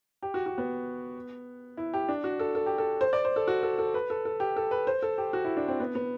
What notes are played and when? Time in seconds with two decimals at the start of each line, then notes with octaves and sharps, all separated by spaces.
0.23 G4
0.34 F#4
0.46 F#4
0.58 B3
1.77 E4
1.94 G4
2.09 D4
2.24 F#4
2.39 A4
2.55 A4
2.66 G4
2.78 A4
3.01 C5
3.13 D5
3.25 C5
3.36 A4
3.48 F#4
3.63 A4
3.78 A4
3.94 B4
4.10 A4
4.25 A4
4.40 G4
4.56 A4
4.71 B4
4.87 C5
5.02 A4
5.18 G4
5.33 F#4
5.45 E4
5.57 D4
5.68 C4
5.80 B3
5.95 B3